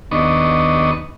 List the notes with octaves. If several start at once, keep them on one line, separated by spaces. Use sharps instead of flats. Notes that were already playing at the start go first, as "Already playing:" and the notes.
D#2 B3 D4 D#5 C#6